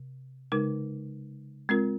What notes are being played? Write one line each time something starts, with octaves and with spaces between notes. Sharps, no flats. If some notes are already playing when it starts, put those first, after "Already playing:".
Already playing: C3
C#3 G#3 D#4 A#4
G#3 C4 F4 A#4